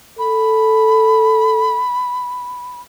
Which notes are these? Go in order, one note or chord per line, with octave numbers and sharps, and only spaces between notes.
A4 B5